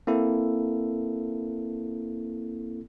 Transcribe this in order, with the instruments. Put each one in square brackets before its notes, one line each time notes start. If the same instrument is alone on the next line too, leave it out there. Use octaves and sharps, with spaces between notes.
[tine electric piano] A#3 C4 E4 A4